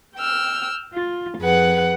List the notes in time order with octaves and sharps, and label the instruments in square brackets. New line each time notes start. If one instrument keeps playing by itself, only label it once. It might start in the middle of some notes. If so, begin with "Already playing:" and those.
[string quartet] G5 E6 F6
F4
F2 G#4 B4 F#5